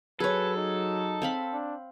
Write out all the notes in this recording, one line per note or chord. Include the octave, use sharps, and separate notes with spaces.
F#3 G#4 A4 B4 C#5
D#4
C4 F5 B5
D4